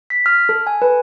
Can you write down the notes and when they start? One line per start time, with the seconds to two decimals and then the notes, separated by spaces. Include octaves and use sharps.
0.10 B6
0.26 F6
0.49 A4
0.67 G#5
0.82 B4